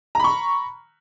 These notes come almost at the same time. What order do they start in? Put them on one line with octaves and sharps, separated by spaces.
A#5 B5 C#6